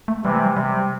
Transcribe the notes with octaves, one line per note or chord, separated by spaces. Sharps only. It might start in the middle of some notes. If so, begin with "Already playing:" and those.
A3
C3 E3 G3
A3
G3
C3 G3